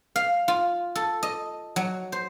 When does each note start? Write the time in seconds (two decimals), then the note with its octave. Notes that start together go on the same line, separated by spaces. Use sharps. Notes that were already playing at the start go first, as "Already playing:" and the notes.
0.16 F5
0.48 F4
0.95 A4
1.23 D#5
1.76 F#3
2.12 C5